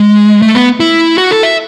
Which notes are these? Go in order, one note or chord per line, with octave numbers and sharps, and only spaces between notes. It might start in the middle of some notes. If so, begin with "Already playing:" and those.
Already playing: G#3
A3
B3
E4
F#4
A4
E5